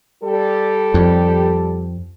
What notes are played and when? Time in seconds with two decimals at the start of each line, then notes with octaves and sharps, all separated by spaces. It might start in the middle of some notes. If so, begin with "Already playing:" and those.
0.23 G3 G4 A4
0.94 F2